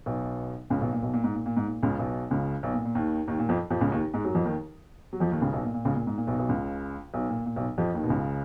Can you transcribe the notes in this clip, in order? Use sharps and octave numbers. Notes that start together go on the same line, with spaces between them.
B1 B2
C#2 C#3
B1 B2
A#2
B1 B2
A#2
G#2
A#2
A#2
G#2
A#2
C#2 C#3
B1 B2
C#2 C#3
B1 B2
A#2
A#2
D#2 D#3
D#2 D#3
A#2
F2 F3
F2 F3
C#2 C#3
D#2 D#3
G#2 G#3
F#2 F#3
F2 F3
D#2 D#3
F#3
F2 F3
D#2 D#3
C#2 C#3
B1 B2
A#2
A#2
C#2 C#3
A#2
G#2
A#2
B1 B2
B1 B2
C#2 C#3
B1 B2
A#2
A#2
B1 B2
F2 F3
D#2 D#3
B2
C#2 C#3